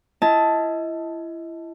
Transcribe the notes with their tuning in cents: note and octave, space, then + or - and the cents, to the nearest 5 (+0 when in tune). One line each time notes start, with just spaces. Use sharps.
E4 +30 D#5 +35 A5 +0